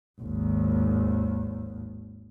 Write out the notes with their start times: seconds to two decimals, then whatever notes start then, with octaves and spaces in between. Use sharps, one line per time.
0.21 G#1 D#2